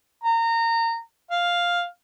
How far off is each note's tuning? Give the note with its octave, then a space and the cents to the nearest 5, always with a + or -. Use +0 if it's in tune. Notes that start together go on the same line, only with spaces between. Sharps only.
A#5 -25
F5 +5